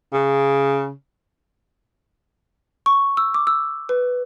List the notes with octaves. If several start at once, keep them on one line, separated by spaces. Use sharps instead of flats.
C#3
C#6
E6
D6
E6
B4